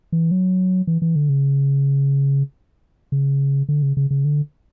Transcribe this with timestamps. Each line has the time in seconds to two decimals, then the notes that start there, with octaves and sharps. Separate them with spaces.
0.12 E3
0.31 F#3
0.87 E3
1.02 E3
1.16 D3
1.29 C#3
3.12 C#3
3.69 D3
3.83 C#3
3.97 C#3
4.11 C#3
4.25 D3